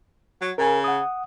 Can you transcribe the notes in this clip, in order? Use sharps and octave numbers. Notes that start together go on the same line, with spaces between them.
F#3
C#3 A#4 G#5
F#5 D#6